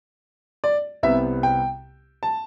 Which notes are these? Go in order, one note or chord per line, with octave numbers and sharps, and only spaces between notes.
D5
C2 C3 G3 B3 E5
G5
A5